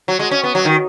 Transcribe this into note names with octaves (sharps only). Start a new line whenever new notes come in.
F#3
G#3
C#4
B3
F#3
D#3